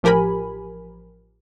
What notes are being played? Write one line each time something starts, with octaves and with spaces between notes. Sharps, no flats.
A1 F3 G4 A#4 G#5 B5